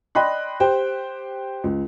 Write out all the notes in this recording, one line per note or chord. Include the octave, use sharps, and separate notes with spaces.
D5 D#5 G5 B5 C6 F#6
G4 C5 G5
C#2